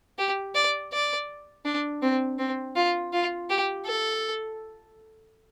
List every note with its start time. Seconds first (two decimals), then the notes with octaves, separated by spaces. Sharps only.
0.18 G4
0.55 D5
0.93 D5
1.65 D4
2.02 C4
2.39 C4
2.76 F4
3.13 F4
3.49 G4
3.86 A4